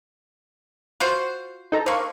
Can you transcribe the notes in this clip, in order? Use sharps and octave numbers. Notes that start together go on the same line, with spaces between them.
F4 F#4 C5
D#4 A4 A#5
D3 A#3 C5 F5 C#6